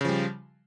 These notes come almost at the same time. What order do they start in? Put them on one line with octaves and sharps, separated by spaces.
C#3 F3 G3